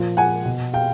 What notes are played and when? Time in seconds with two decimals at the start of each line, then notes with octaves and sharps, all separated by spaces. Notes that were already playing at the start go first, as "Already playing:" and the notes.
Already playing: A#2 F3
0.17 F#5 G#5
0.46 B2
0.74 F5 G5